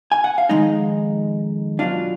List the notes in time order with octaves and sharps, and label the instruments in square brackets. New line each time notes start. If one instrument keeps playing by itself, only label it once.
[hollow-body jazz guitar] G#5
F#5
F5
F2 D#3 G#3 D#4 D#5
B2 F#3 D4 F4